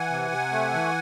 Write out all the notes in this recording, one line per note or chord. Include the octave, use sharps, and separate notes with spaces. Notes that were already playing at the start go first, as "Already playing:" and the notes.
Already playing: E3 F#5 G#5
C3
C3
A3
E3